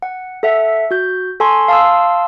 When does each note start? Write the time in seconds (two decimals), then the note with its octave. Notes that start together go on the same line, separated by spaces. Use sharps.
0.02 F#5
0.43 A4 E5 F#5
0.91 F#4 G6
1.40 A4 G#5 A5 C6 C#6
1.68 F5 A5 C6 D#6 E6